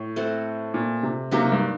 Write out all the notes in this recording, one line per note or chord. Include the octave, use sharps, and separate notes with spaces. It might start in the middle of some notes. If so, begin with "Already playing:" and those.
Already playing: A2
A3 C4 F#4 A4
A#2
C3
C3 F#3 A#3 D#4 F#4
G2